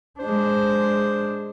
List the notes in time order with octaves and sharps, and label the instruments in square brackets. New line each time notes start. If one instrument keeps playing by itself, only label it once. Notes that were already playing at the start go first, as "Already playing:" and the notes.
[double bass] G#3 D4 [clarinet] C5